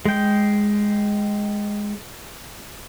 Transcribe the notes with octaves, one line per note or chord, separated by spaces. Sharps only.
G#3 G5